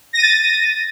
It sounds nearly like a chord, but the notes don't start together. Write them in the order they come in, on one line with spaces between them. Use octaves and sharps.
A#6 D#7 A6